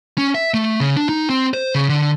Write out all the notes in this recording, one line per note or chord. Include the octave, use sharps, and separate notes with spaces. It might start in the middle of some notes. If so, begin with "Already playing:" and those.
C#4
E5
A3
C#3
D4
D#4
C4
C5
C#3
D3